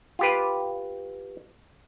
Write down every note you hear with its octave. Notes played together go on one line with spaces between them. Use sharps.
F4 G4 B4